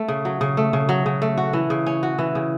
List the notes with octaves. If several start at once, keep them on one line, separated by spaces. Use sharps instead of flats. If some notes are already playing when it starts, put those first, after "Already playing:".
Already playing: A3
C#3
F#3
C#3
A3
C#3
F#3
C#3
A3
F#4
E3
C#3
C#4
F#4
E3
C#3